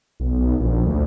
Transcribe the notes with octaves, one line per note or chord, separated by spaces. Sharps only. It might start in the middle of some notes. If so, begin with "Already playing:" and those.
B1
A#1
D2